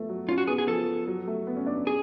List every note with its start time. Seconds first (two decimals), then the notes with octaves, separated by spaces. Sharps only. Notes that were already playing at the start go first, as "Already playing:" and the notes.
Already playing: F3 A3 B3
0.09 F#3
0.28 C#4 F4
0.38 F#4
0.47 B3 G#4
0.58 G#4
0.68 F3 A4
1.07 F#3
1.27 A3
1.47 B3
1.56 C#4
1.66 D4
1.76 C#4
1.87 G#4